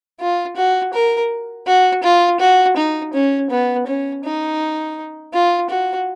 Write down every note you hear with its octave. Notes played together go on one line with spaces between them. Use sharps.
F4
F#4
A#4
F#4
F4
F#4
D#4
C#4
B3
C#4
D#4
F4
F#4